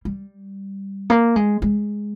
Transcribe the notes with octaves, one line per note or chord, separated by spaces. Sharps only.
G3
A#3
G#3
G#3